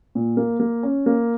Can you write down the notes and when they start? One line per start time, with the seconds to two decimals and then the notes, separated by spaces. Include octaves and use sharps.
0.15 A#2
0.37 A#3
0.60 A#3
0.83 C#4
1.06 A#3